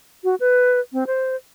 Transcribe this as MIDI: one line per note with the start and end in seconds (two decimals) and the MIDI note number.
0.24 0.35 66
0.40 0.80 71
0.93 1.04 60
1.07 1.36 72